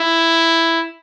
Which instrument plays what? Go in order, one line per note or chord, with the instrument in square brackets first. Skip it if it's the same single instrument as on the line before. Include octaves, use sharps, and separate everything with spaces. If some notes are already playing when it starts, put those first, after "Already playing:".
Already playing: [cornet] E4